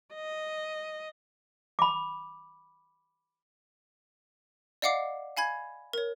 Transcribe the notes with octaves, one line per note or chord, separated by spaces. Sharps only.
D#5
B5 D6
D5 D#5 F5 F#5 D6 C7
F5 G#5 B5 G#6
A#4 C#5